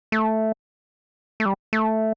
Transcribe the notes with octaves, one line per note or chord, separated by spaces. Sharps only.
A3
A3
G3
A3